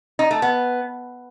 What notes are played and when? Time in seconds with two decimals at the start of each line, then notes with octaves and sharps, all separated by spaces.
0.19 D#4
0.31 A3
0.42 B3